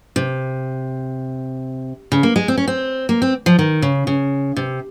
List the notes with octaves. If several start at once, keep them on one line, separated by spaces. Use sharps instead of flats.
C3
C#3
A#3
G#3
C4
C#4
C4
A#3
C4
F3
D#3
C#3
C#3
C3